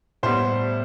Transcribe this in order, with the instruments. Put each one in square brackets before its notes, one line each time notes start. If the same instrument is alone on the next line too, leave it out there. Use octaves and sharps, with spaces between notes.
[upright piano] A2 G3 B3 C5